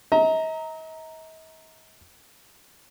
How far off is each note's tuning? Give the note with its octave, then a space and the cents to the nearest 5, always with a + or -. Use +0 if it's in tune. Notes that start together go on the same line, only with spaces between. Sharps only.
D#5 +45 A#5 -5